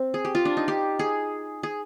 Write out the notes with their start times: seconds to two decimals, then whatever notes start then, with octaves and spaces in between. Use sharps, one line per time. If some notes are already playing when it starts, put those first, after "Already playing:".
Already playing: C4
0.14 G#4
0.25 G4
0.35 F4
0.45 D4
0.57 D#4
0.68 G4
0.99 G#4
1.63 G#4